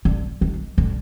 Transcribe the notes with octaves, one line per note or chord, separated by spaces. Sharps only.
D3
D#3
D3